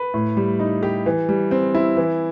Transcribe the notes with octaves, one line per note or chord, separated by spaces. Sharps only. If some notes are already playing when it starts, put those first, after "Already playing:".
Already playing: B4
A2
G3
D#4
G4
E3
G3
C4
E4
E3